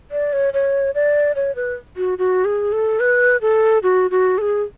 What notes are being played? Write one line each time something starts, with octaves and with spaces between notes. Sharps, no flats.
D5
C#5
C#5
D5
C#5
B4
F#4
F#4
G#4
A4
B4
A4
F#4
F#4
A4
G#4